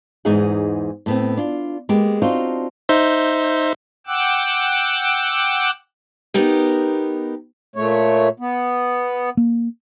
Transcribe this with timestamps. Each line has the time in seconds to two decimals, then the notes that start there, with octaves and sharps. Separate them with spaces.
0.25 E2 G#2 B3 D#4 G#4 F#5
1.06 A2 B3 C4
1.37 D4 F4
1.89 G#3 A#3 B3 G4
2.22 C4 D4 D#4 F4 F#4
2.89 D#4 C5 E5
4.07 F#5 G5 D6 E6 F#6
6.34 B3 D#4 G4 A#4
7.76 A#2 A3 C#5
8.40 B3
9.37 A#3